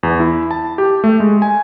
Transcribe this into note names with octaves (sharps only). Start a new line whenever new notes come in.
E2
E4
A5
G4
A3
G#3
G#5